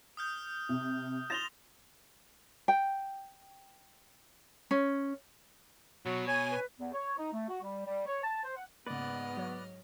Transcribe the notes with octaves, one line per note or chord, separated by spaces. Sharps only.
D#6 F6 G6
C3
C6 A6 A#6 E7 F7 G7
G5
C#4
B2 F#3
C#5 G#5 G#6
B4
E2
C#5
D#4
A3
F#4
G3
G3
C#5
A5
C5
F#5
G#2 C#3 A#3 B3 B4 D5 D#5 F6
F#3 C#5